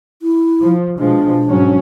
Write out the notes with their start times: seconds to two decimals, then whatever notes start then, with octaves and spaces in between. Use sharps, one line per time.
0.22 E4
0.61 F3
0.99 B2 F3 G#3 D4
1.47 G#2 F#3 C#4